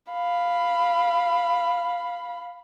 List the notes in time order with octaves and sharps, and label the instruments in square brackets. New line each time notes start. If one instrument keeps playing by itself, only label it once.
[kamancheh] F5 B5